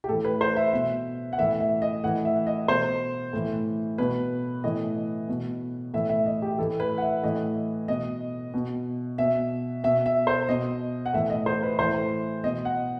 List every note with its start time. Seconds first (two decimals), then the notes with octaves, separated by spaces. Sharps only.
0.04 G4
0.08 A2 E3 A4
0.25 B4
0.41 C5
0.56 E5
0.73 B2 E5
1.33 F#5
1.38 A2 E3 E5
1.60 E5
1.82 D#5
2.03 A2 E3 F#5
2.25 E5
2.47 D#5
2.68 B2 C5
3.33 A2 E3
3.98 B2 B4
4.64 A2 E3 D#5
5.28 B2
5.94 A2 E3 E5
6.09 E5
6.26 D#5
6.42 G4
6.58 A2 E3 A4
6.80 B4
6.98 F#5
7.02 E5
7.23 A2 E3 D#5
7.88 B2 D#5
8.54 B2
9.18 B2 E5
9.84 B2 E5
10.06 E5
10.27 C5
10.49 B2 D#5
11.06 F#5
11.13 A2 E3 E5
11.30 D#5
11.46 C5
11.63 B4
11.79 A2 E3 C5
12.44 B2 D#5
12.65 F#5